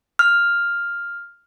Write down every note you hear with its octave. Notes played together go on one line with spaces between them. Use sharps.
F6